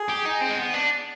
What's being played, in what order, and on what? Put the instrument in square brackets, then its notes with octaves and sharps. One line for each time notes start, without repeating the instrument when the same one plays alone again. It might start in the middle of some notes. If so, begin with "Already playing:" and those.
Already playing: [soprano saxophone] G#4
[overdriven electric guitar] G4
D#4
C4
G#3
B3
D4